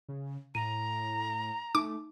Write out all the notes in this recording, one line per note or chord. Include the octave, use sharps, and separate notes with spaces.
C#3
A2 A#5 D#7
A3 D#4 D6